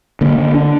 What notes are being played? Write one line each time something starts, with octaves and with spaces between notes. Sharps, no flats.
D3 A#3
D3
D4